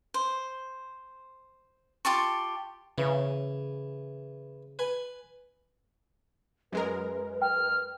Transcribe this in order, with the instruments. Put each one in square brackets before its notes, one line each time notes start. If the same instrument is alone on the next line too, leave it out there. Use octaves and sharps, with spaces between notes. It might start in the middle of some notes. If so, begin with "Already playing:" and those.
[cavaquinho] C5
F4 G4 A5 C#6
[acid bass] C#3 [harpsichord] E3
[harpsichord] B4 G#5
[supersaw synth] F#2 G#3 A#4 [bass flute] B4
[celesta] G5 [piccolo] F6